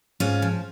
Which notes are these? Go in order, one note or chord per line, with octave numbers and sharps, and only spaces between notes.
G#2 C#4 F4
F3